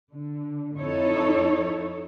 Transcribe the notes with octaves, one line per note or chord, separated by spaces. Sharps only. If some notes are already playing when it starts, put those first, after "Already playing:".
D3
F2 D#4 E4 A4 C#5